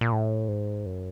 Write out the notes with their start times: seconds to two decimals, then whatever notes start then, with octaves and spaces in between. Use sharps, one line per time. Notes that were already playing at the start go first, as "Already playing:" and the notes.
0.01 A#2
0.12 A2
0.48 G#2
0.86 F#2